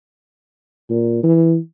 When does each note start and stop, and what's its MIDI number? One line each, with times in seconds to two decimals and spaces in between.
0.90 1.23 46
1.23 1.56 52